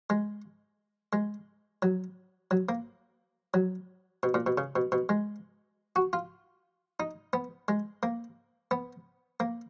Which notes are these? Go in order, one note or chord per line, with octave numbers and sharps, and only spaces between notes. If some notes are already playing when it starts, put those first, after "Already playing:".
G#3
G#3
F#3
F#3
A#3
F#3
B2
A#2
B2
C#3
B2
B2
G#3
F#4
F4
D#4
B3
G#3
A#3
B3
A#3